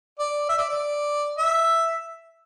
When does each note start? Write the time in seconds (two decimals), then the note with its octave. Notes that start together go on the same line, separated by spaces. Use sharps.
0.19 D5
0.49 E5
0.58 D5
0.69 D5
1.38 E5